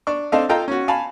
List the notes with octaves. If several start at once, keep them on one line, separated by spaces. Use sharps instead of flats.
D4 D5 C#6
C4 D4 A4 D#5 F5 A5
F4 A4 D#5 F5 G5 A#5
C#4 F#4
F5 G#5 A5 B5